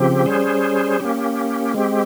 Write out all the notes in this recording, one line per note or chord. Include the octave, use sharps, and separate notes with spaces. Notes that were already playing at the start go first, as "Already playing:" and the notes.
Already playing: C#3 F3 C4 G4
G3 C#4 G#4 C5
A#3 C#4 G4
G#3 C4 G4